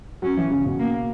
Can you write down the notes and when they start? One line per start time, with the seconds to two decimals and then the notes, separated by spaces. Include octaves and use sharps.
0.22 F#3 C#4
0.37 E3
0.51 C#3
0.66 B2
0.79 A#3